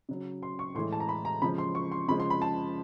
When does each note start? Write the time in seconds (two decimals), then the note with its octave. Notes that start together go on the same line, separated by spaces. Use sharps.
0.09 C#3 F#3
0.43 C6
0.59 C#6
0.75 A2 E3 G#3 C6
0.93 A5
1.00 A#5
1.09 B5
1.25 A#5
1.42 C#3 F3 G#3 B5
1.58 C6
1.75 C#6
1.92 C6
2.08 C#3 F3 G#3 B5
2.20 C6
2.30 B5
2.42 A5